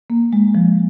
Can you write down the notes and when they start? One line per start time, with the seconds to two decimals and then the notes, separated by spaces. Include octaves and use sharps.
0.10 A#3
0.33 G#3
0.55 F3